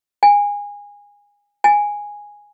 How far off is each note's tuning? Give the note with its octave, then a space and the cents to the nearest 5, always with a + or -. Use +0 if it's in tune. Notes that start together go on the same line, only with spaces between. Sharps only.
G#5 -25
G#5 -5